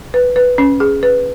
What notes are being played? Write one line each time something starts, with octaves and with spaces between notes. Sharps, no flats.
B4
B4
C#4
G#4
B4